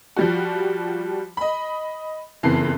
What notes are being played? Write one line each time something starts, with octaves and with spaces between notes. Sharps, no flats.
F3 G3 F#4
D#5 B5
F#1 F2 E3 B3 C7